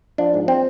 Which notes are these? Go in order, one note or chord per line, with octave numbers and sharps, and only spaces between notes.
F3 D4
G#2
C4